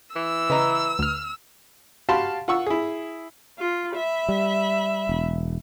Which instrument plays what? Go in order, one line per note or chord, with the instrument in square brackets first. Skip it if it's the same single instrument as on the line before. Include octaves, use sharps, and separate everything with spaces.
[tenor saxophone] E3 [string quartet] E6
[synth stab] C#3 [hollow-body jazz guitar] B4 D#5 A#5
[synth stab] D2 F6
[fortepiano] F#4 G4 F5 A5 B5 C6
F4 F#5 C#6 E6
E4 G#4
[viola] F4
E5 B5
[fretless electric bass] G3
E1